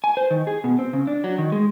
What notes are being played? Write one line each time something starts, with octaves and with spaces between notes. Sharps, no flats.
G#5
C5
D#3
G#4
B2
C4
C#3
D4
F#3
D#3
G#3